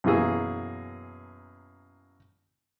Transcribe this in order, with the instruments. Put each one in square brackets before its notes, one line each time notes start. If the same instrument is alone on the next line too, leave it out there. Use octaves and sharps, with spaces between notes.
[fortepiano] F#2 B2 E3 A#3 G#4 E6